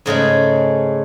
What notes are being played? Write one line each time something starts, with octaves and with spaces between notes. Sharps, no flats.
G#2 C#3 G#3 A3